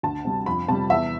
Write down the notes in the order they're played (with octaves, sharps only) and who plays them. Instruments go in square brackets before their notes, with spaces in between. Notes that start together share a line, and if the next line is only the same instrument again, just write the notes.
[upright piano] D2 A5
C3 G3
F2 B5
C3 G3 A5
E2 E5